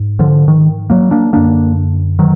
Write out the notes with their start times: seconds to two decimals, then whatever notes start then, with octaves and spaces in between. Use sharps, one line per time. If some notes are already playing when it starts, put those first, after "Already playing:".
Already playing: G#2
0.19 D3 F3
0.48 D#3
0.90 F#3 A#3
1.11 A#3 D4
1.33 F#2 D3 A#3 D4
2.19 D#3 F#3